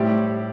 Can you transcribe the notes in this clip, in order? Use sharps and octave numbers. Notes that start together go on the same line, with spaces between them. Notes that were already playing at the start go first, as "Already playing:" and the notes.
Already playing: A2 G3 C4 E4 G4